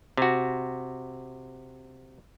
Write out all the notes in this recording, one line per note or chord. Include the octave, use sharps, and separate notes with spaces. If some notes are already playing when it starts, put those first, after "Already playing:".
C3 F#4